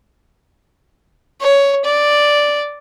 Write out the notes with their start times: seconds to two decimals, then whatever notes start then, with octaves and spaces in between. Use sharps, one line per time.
1.41 C#5
1.85 D5